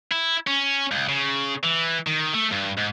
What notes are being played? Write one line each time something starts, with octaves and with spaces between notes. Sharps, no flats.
E4
C#4
C#2
C#3
E3
D#3
A3
G2
G#2